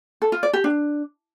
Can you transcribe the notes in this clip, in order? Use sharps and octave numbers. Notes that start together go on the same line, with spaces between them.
A4
F4
D5
G4
D4